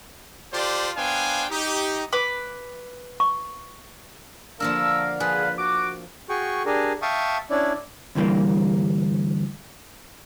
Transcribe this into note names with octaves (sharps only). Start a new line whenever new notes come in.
F4 G4 A4 C5 D5
B3 D4 C5 F5 G5 G#5
D#4 G4
B4 D6
C#6
D3 F3 A#3 D4 A#4 F5 E6
F3 G#4 B4
F#4 D6
F#4 G#4 G5 C#6
D4 G4 G#4 A#4
E5 F5 G5 A5 C#6 D#6
C#4 D4 E4 D5
D2 G2 E3 G3 A#3